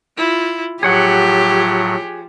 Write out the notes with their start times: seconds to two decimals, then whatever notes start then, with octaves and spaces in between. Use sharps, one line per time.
0.17 E4 F4
0.83 A2 F3 F#3 G4 G#4 C#5 F#5